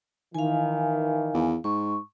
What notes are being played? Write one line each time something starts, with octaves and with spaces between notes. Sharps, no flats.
D#3 E3 F5 G#5
E2
G#2 C#6